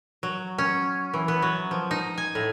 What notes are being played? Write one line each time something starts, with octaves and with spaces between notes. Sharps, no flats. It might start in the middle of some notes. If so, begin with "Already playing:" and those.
F#3
C#4
E3
B3
F#3
F3
D#4
G#5
A2